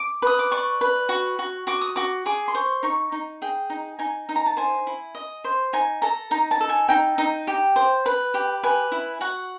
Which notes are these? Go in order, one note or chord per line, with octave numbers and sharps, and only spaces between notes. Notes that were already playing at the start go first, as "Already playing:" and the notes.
Already playing: D6
B4 D#6
D6
D5 C#6
B4
F#4
F#4
F#4 D6
D#6
F#4 D6
G#4 D6
C6
C5 C#6
D#4 C#6
D#4
G#4 G5
D#4
D#4 G#5
D#4
A#5
A5
C5 G#5
E4
D#5
C5
D#4 G#5
A4 A#5
D#4 A#5
A5
A4
G#5
D#4 G5
D#4
G4
C5
B4
G4
B4 G#5
E4
F#4 F#5